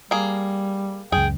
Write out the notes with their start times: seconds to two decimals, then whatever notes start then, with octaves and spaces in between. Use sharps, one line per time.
0.11 G3 A#3 G#4
1.12 C#2 F#2 G#4 G5